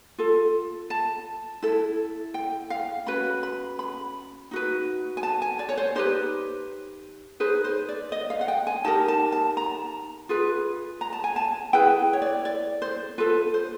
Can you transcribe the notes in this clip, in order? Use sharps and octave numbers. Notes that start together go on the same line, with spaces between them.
F4 A4
A5
E4 A4
G5
F5
C#4 F#4 B4 B5
B5
B5
D#4 F#4 B4
G#5
A5
G#5
D5
C#5
C5
D#4 G4 B4 C5
D#4 G#4 B4 C5
C5
D5
D#5
F5
F#5
G5
G#5
D#4 G4 A#4 A5
A5
A5
A#5
F4 G#4 B4
A#5
A5
G#5
A5
E4 G#4 B4 G5
C#5
D5
D5
C5
F4 A4 B4
C5